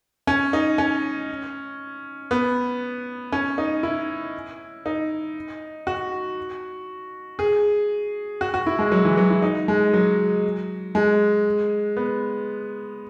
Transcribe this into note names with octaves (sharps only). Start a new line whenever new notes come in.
C#4
D#4
C#4
B3
C#4
D#4
E4
D#4
F#4
G#4
F#4
F#4
E4
G#3
F#3
E3
F#3
E4
D#4
G#3
F#3
G#3
B3